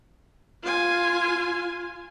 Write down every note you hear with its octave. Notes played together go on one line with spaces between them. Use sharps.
F4 G#5